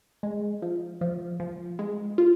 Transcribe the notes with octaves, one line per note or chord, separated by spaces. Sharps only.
G#3
F3
F3
F3
G#3
F4